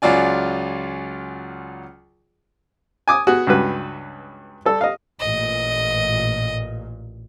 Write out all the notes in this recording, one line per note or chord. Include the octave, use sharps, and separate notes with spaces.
C#2 F#3 F4 D5 G#5
G#5 D6 D#6
B3 F#4 G#4
C#2 G2 F#4 B4
G3 A4
D#5 F5
A1 A#2 D#5